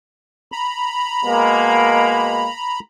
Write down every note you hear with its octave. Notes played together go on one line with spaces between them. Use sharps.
A#5 B5
B2 G#3 A#3